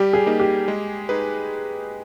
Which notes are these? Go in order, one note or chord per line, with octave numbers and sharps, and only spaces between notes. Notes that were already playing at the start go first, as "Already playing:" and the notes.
Already playing: G3 G4
G#4
A#3 D#4
G4
G#3
D#4 G#4 B4